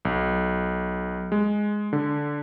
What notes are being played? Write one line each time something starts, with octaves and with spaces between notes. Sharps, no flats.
B1
G#3
D3